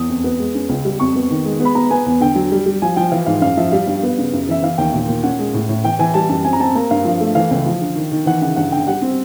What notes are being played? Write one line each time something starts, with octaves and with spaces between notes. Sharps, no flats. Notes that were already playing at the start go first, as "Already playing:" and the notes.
Already playing: E2 D#6
F2
B3
G#3
C#4
C#2
G3
F2 C#6
B3
D#3
G#3
B3
B5
B3 A#5
B3 G#5
E2
D3 G5
F#3
G3
G3
F3 G#5
F3 G5
E3 F5
G#2 F5
F#2 F5
F3 E5
G3 F5
G2
B3
C#3
F#2
E3 E5
E3 F5
D#2 G5
A#2
A#2
C#4 F#5
G#3
A2
A2
E3 G5
E3 G#5
G3 A5
F#2 A5
C4 G#5
A#5
C4 A5
A#3 A#5
G2 F5
F3
A3
E3 F5
C#2
F3
D3
D#3
D#3
E3 F#5
C#3 F#5
G2 F#5
D3 G5
G3 F#5
C4